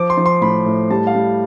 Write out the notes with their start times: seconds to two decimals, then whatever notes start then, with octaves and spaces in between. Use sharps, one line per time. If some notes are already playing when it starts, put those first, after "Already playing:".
Already playing: F3 D6
0.10 C6
0.17 F3
0.26 C6
0.42 A2 B5
0.66 A2
0.90 G3 A5
1.07 F5
1.15 G3